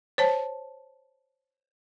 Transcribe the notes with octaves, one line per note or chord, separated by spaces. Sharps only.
C5 C#5 A5